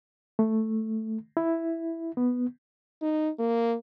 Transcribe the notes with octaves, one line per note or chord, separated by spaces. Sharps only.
A3
E4
B3
D#4
A#3